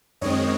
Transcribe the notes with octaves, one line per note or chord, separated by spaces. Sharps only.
F#2 D#3 G#3 C4 C#5 D#5